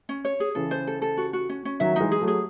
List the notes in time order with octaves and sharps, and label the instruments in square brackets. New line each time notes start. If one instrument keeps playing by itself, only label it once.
[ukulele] C#4
C#5
G#4
[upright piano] C#3 E3 [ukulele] A4
[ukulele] C5
A4
A4
F#4
F#4
C#4
C#4
[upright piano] D#3 F#3 [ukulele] E5
[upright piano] F#3 [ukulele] D#4
[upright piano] E3 G#3
[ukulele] G#4
[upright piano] F#3 A3
[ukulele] G#4